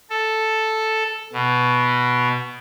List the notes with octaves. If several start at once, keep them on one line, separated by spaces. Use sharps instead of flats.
A4
B2